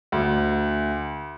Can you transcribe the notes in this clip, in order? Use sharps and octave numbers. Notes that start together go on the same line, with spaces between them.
D2